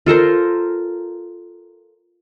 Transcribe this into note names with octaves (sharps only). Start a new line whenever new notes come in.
F4 A4 A#4 C5